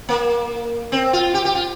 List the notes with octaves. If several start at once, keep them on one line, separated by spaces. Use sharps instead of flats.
A#3
C4
F4
G4
G4
F4